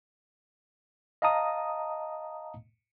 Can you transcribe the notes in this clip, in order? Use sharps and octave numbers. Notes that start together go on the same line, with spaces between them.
D#5 F5 A5 A#5 D#6